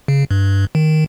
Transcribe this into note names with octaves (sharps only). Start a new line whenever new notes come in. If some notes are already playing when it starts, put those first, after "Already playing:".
C#3
G2
D#3